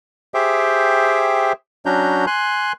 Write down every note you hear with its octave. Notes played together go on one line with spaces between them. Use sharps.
G4 G#4 C5 E5 G5
F#3 C#4 D4 F#4 A#5 G6
G#5 C6 F#6